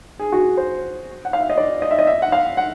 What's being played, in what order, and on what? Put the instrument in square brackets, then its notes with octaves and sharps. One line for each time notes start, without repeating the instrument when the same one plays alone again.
[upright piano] G#4
F#4
C5
F#5
F5
E5
D#5
D5
D#5
E5
D#5
E5
F#5
F5
F#5